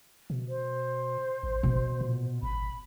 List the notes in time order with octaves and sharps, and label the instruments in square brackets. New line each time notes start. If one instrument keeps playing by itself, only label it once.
[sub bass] B2
[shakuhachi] C5
[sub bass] A1
[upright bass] B2
[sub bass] A#2
[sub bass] G#1 [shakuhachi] B5